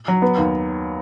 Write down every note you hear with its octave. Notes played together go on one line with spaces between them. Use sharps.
F#3
B3
D#2